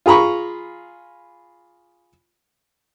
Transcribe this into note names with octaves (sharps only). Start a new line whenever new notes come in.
F4 G#4 A#5 B5 C#6